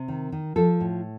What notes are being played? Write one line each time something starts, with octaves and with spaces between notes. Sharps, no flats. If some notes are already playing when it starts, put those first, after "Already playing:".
Already playing: C3
D#3
D#3
F3 A4
A2